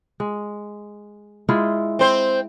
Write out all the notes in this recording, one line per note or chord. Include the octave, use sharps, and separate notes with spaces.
G#3
G#3 E4 F4
C4 C5